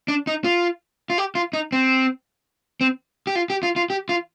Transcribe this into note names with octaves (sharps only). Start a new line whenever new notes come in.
D4
D#4
F4
F4
G4
F4
D#4
C4
C4
G4
F4
G4
F4
F4
G4
F4